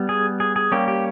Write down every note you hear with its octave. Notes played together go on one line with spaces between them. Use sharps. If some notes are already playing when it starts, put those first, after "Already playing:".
Already playing: G3 B3
G#4
G#4
G#4
G3 A#3 C#4 G4
G4